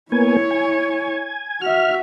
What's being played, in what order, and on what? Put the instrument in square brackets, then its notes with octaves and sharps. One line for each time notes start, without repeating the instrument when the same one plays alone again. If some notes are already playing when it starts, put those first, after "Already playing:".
[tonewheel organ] A#3 B3 G#5 [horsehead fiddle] E4 C#5
[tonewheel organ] G#5
[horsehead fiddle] F#4 E5 [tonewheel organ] F6